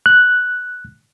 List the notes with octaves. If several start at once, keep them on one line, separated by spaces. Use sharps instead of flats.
F#6